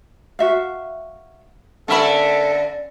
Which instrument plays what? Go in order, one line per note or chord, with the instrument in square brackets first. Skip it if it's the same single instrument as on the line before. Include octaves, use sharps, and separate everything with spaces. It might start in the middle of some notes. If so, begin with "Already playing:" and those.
[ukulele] F#4 E5 F5
[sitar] D3 A#3 E5 [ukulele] C#4 B5 [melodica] A4